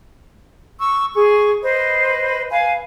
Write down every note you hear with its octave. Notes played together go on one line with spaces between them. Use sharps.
C#6 E6
G#4 C#6
B4 C5 D#5
B4 F5 G#5